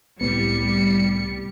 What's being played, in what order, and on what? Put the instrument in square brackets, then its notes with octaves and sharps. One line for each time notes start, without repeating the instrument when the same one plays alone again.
[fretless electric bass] C2 A2 B3 [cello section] G3 [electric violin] C#7